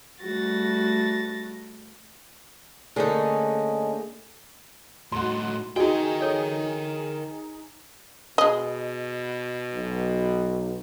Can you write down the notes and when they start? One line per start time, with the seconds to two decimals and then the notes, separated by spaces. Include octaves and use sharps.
0.23 G3 A3 F#4 A6 A#6
2.96 D3 A3 A#3 C#4 D#4 G#4
5.12 A2 D#4 F#4 C6
5.76 D#4 F#4 G#4 A#4 D#5 G5
6.21 A4 C#5 D#5
8.38 B2 G#3 D#5
9.74 B1